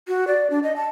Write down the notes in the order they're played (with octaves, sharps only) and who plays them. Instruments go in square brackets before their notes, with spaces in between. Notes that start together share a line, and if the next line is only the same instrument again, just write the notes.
[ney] F#4
D5
D4
D#5
A5